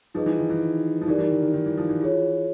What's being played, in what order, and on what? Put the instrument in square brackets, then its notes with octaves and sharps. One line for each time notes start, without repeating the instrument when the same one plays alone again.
[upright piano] F3 [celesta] D#4 G#4 B4 D#5
[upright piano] E3
D#3
E3
F3
[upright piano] E3 [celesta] D#4 G4 A#4 D5
[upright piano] E3
D#3
D#3
D#3
E3
F3
E3
[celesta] F4 G#4 C#5